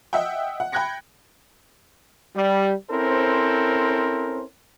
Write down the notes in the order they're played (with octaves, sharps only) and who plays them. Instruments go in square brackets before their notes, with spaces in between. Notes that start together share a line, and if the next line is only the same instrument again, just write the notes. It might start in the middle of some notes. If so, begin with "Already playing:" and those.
[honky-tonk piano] D#5 E5 F#5 G5
F#5
G5 B5 F#6 G#6 A#6 C#7
[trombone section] G3
C4 C#4 E4 A4 A#4 C5